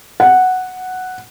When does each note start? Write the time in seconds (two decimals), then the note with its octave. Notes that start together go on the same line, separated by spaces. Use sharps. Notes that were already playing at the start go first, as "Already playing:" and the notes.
0.20 F#5